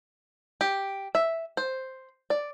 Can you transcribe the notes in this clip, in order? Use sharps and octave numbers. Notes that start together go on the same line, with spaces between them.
G4
E5
C5
D5